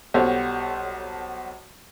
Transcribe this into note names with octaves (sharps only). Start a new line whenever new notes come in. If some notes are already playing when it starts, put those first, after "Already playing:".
B1 G3 F#4 A4 C5 C#5